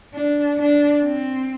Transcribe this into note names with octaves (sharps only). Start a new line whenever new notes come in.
D4
D4
C4